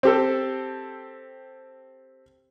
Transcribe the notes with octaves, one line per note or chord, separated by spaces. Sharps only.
C4 G4 A4